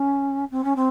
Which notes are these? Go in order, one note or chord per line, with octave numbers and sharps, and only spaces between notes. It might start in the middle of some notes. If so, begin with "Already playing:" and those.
Already playing: C#4
C4
C#4
C4